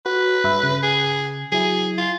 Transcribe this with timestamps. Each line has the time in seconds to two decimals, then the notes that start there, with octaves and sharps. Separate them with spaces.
0.06 F#4 B4
0.44 G2 E5 B5
0.63 C#3
0.83 G#4
1.52 F#3 E4 G#4
1.98 F4